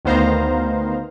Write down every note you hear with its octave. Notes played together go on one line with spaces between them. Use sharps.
D2 D#3 B3 C5 F5 A#5